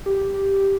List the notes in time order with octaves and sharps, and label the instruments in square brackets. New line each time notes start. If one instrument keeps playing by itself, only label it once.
[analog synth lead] G4